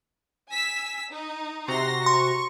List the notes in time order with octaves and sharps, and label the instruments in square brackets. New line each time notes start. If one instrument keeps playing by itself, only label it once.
[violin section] G#5 E6 B6
D#4
[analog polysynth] C3 F#4 A#5 [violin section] C6 A#6
[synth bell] C6 [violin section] C#6